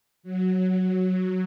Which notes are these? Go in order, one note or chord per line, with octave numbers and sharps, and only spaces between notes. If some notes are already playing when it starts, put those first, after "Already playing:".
F#3